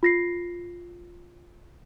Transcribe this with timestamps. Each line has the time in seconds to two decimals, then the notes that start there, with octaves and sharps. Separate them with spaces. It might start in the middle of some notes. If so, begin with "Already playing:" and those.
0.03 F4 A#6 C7